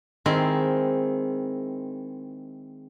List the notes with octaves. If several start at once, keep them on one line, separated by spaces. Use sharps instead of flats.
D#3 G#3 C4 E4